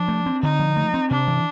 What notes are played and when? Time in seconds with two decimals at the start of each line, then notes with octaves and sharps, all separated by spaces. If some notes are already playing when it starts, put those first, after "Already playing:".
Already playing: F3 D4
0.08 A3
0.26 C4
0.43 D3 D#4
0.59 F3
0.77 A3
0.94 C4
1.11 C3 D4
1.28 E3